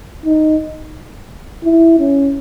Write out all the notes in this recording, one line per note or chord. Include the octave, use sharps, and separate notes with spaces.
D#4
E4
C#4